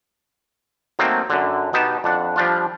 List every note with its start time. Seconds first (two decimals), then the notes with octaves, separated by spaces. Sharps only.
0.99 F#3 A3 A#3 C4 D#4
1.30 F#2 D3
1.73 B2 B3 D#4 G4 A5
2.04 F2 D4 F#5
2.36 F3 G3 D4 F4